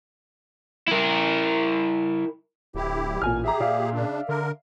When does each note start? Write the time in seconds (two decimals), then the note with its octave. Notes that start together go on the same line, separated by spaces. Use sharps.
0.88 E4 A#4
2.74 D1 E4 G4
3.22 A1 A#2 G#5 F6
3.44 G4 G#4 E5 A#5
3.60 A#2 D5 E5 F5
3.94 C#3 D4
4.29 D3 A#4